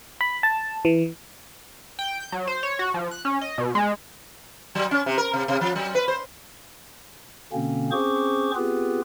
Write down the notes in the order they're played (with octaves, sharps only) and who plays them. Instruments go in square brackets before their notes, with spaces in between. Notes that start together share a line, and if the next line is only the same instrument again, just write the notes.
[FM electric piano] B5
A5
E3
[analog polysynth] G5
G6
F#3
C5
C#5
F#4
F3
F#6
C#4
D#5
B2
G#3
[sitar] F#3
C#4
C3
A#4
C3
C3
F3
F#3
B4
C5
[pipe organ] B2 D3 A#3 C4 C#4
C4 C#4 G#4 C5 C#6 D6
B3 C4 F4 G4 G#4 B4